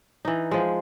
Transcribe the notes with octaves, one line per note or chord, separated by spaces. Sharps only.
E3 D#4
F3 G#3